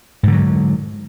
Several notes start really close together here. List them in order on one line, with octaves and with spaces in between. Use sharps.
G#2 D3 F#3